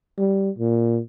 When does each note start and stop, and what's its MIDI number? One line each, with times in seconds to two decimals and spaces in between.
0.18 0.50 55
0.58 1.00 46